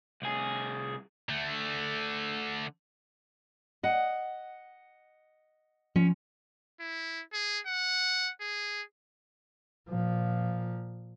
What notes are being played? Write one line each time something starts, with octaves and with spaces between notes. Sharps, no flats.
C2 G#4
D3 A3
D#5 F#5
F3 C#4
E4
G#4
F#5
G#4
A#2 F3